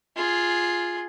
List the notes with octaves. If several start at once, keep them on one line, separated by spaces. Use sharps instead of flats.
F4 G#4